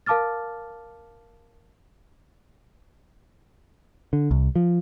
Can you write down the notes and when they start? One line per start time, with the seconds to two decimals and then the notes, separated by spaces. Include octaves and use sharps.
0.06 A#4 F5 A5 D6 F6 A6
4.13 D3
4.31 C2
4.56 F3